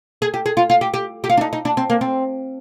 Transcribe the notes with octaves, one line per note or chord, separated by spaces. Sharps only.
G#4
G4
G#4
F4
F4
G4
G4
G4
F4
D4
D#4
D#4
D4
C4
A#3
C4